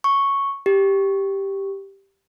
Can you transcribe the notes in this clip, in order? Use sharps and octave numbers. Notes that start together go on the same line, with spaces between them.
C#6
G4